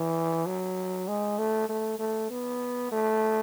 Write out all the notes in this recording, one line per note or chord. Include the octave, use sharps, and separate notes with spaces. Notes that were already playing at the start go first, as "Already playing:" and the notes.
Already playing: E3
F#3
G#3
A3
A3
A3
B3
A3